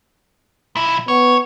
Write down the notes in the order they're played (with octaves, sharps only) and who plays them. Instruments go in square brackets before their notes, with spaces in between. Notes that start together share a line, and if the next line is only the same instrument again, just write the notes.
[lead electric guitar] B1 E4
[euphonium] B3 [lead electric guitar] C#5